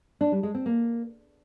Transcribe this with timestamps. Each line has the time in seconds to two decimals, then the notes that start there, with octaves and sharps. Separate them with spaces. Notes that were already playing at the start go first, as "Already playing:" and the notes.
0.21 D4
0.32 G3
0.43 G#3
0.55 C4
0.66 A#3